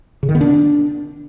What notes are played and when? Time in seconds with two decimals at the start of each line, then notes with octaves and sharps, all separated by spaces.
0.23 C#3
0.29 D#3
0.35 B3
0.41 D4